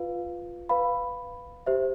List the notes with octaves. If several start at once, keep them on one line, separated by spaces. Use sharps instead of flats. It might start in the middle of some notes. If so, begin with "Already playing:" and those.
Already playing: F4 B4 F5
B4 F5 B5
G4 C5 E5